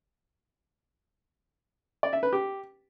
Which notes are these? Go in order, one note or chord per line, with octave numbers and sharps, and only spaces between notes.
D5
E5
B4
G4